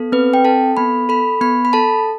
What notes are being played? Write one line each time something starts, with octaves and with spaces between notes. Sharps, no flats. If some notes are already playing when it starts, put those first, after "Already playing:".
Already playing: B3 A4
C4 B4
G5
A4 A5
B3 B5
A4 B5
B3 B5
B5
A4 A5